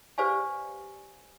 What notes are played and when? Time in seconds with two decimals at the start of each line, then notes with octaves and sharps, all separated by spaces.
0.18 G4 B4 C5 D5 F5 G#5